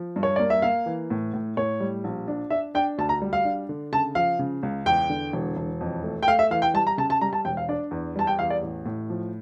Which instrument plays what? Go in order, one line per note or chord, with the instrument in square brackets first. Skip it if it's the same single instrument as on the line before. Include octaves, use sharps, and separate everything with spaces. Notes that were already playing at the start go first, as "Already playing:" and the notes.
Already playing: [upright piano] F3
G2
[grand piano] C#5
[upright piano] A#3 [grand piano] D5
[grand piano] E5
[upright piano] A#3 [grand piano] F5
[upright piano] E3
A2
A2
[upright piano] A2 [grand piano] C#5
[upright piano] G3
A#1
D4
[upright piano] D4 [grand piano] E5
[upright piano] D4 [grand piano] G5
[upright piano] D2 [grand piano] A5
[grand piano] A#5
[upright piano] G3
[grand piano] F5
[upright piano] D4
D3
[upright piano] C#3 [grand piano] A5
[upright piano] F3 [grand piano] F5
[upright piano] C#3
C#2
[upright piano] E2 [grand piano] G5
[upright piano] D3
E1
E1
F2
A3
[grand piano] G5
[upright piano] A3 [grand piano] F5
[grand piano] E5
[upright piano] E3 [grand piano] F5
[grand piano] G5
[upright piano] G3 [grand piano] A5
[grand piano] A#5
[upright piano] C#3 [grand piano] A5
[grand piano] A5
[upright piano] G3 [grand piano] A#5
[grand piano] A5
[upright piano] E1 [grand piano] G5
[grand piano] F5
[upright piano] D4 [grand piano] D5
[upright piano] E2
[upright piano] G3 [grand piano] A5
[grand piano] G5
[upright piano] E2 [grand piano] F5
[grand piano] D5
[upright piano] A1
A2
F3